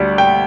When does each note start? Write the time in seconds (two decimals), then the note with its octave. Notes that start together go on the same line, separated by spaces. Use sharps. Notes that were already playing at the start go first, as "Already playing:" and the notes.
Already playing: D2 D3 G3
0.18 G5